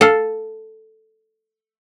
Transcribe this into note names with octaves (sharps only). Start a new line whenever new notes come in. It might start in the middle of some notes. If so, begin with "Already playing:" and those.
A4 F5